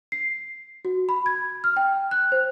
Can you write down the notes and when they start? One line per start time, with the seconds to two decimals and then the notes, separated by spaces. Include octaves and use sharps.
0.12 C7
0.85 F#4
1.09 B5
1.26 G#6
1.64 F6
1.77 G5
2.11 F#6
2.32 C5